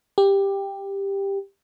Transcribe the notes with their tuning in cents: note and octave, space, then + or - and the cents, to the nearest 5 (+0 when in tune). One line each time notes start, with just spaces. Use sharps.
G4 +10